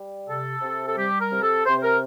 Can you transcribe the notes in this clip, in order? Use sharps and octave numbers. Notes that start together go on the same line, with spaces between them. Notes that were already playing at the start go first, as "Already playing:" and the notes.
Already playing: G3
C3 A4
C3
A4
G3 G4
A#4
C3
A4
C3 C5
C5
A#4